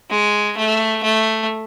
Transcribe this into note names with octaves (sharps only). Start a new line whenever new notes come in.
G#3
A3
A3